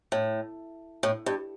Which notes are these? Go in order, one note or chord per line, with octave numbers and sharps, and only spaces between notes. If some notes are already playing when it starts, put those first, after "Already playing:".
A2
A2
G2